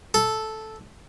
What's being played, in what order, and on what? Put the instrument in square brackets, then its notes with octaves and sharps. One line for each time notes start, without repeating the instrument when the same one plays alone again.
[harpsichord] A4